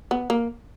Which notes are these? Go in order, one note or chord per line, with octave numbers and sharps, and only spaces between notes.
B3
A#3